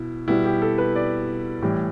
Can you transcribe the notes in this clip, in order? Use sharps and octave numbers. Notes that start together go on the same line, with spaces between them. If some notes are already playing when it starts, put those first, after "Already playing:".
Already playing: B2 E4
B2 G3 B3 E4
G4
A4
B4
D5
A2 E3 G3